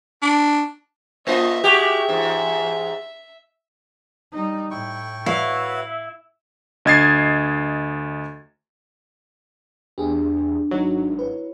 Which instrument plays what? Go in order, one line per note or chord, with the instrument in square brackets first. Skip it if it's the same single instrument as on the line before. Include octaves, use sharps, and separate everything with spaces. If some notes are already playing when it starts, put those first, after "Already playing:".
[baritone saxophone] D4
[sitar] A#3 F4 D#5 [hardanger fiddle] E5
[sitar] G#3 F#4 G4
E2 G#2
[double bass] G3 D#4
[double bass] A2 [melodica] E4 G5 C#6
[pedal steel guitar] E4 E5 [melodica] F#4 B4 C#5 [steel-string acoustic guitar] F5
[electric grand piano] D2 D#5 G#6 A6 C7
[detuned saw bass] E2 [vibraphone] D4 [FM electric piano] G4 G#4
[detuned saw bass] G#1 [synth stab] F#3 [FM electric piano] D#4
[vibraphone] E4 C#5 [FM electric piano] B4